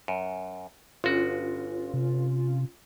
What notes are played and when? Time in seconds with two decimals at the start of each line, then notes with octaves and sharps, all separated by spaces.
0.08 F#2
1.04 G1 C#4 F4 F#4
1.94 C3